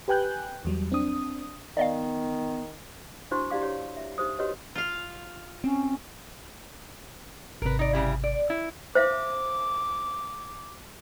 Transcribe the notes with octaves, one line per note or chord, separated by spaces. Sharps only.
G4 B4 G5 G#5 F#6 G6
E2 F#3 G3
C4 D4 D#6
D#3 B3 D5 D#5 F5
D4 E4 F#4 C5 C6 C#6
E4 G4 D5 F5 D6
G4 C#5
E5
D#4 G4 C5 D#6
F#4 G4 B4 C#5 D#5
F4 F5
C4 C#4
G#1 C3 A#4 B4
D#4 D5
C#3 G3 E4
D5
E4
C5 E5 F5 D6